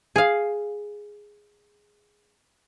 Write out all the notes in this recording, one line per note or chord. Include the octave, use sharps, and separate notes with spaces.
G#4 F5